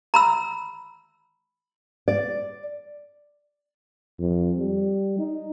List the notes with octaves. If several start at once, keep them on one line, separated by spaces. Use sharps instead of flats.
A#5 B5 E6
D5
F2
G3
D#4